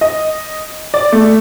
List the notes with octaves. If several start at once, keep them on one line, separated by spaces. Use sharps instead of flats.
D#5
D5
A3